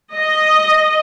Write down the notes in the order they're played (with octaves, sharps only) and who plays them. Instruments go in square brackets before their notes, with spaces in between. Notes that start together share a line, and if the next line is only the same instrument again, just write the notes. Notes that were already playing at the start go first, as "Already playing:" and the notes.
[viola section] D#5